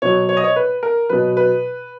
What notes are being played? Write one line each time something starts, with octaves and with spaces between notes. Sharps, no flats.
B2 F#3 C#5
C#5
D#5
C#5
B4
A#4
B2 F#3 B4
B4